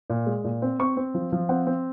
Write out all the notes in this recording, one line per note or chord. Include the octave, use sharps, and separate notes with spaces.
A#2
G#3
A#2
C4
C4 C#6
C4
F3
F3
C4 F#5
C4